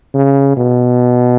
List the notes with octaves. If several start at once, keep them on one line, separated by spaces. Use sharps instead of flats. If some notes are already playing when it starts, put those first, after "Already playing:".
C#3
B2